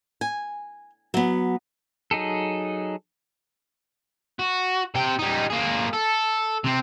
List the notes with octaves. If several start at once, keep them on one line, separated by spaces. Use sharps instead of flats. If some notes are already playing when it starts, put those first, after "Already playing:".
G#5
F#3 B3
F#3 D#4 G#4 A4
F#4
C3 G5
G3 D#4
A#3 G#4
A4
C3 C4